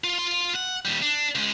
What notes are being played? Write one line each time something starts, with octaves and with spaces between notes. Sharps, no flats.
F4
F4 C6
F#5
D#2 G3
D4
C#2 G#3